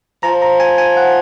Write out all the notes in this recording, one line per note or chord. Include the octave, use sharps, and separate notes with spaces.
F3 A#5
A#5
G#5
G#5
F#5